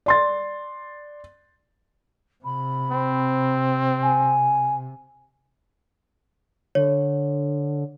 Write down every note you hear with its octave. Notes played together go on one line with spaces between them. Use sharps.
D5 C6 A6
C3 B5
C4
G#5
D3 C#5